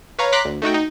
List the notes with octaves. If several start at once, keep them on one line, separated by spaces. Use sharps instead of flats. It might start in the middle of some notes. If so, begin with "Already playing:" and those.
B4 C#5 F5 A#5
A#5 C6 D6 F#6 B6
D2
A3 D#4 F#4 G5
D#4